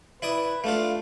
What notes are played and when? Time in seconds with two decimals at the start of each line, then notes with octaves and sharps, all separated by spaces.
0.22 E4 B4 D5 D#6
0.64 A3 D4 F4 F5